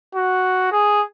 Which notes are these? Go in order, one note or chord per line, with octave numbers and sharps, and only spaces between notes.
F#4
G#4